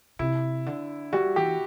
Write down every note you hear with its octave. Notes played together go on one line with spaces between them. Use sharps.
C3 E4
D3
G3 F#4
E3 G4